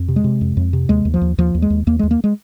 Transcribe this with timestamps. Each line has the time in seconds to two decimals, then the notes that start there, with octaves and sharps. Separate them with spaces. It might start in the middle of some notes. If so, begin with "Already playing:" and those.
Already playing: F2
0.08 C3
0.16 G#3
0.24 C3
0.41 F2
0.57 F2
0.73 C3
0.89 D#2 G#3
1.05 D#2
1.14 F3
1.22 D#2
1.38 D#2 F3
1.55 D#2
1.62 G#3
1.70 D#2
1.87 D#2 A#3
1.99 G#3
2.03 D#2
2.11 A#3
2.24 G#3